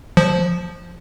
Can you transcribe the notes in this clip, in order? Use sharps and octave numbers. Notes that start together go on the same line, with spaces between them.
F3